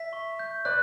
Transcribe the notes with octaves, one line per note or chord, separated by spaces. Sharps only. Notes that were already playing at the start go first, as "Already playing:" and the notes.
Already playing: E5 B6
C#6
G6
B4 D5 F#6